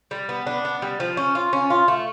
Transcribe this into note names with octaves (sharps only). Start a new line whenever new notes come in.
G3
B3
D4
B3
G3
F3
C#4
F4
C#4
F4
A3